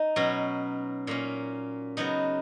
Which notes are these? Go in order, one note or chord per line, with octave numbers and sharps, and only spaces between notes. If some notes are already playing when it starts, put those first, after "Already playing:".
Already playing: D#4
B2 F#3 C#4
A#2 A#3 C#4
C#3 F#3 B3 D#4